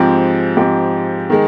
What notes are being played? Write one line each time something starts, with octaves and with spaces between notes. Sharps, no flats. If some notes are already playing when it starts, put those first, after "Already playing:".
Already playing: G#2 F3 C4 G4
G#2 F3 C4 G4
D#3 G#3